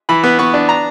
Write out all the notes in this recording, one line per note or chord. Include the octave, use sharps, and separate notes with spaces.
E3 B5
B3
B3 C#6
D4
A#5